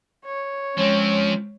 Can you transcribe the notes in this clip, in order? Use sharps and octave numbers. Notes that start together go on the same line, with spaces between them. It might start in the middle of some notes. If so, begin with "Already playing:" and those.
C#5
F3 G#3 C4 C#4